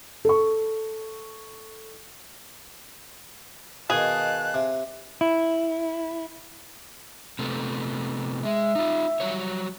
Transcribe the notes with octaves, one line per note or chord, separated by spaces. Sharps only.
A4 C#6
B2 D#3 G#4 F5 A5 F#6
C3
E4
C3 A3 B3
G#3 E5
D#4 F4
F#3 G3 C#5